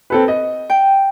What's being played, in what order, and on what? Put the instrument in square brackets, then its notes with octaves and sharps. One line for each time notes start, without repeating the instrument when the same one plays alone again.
[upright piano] C4 A4 B4
D#5
[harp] G5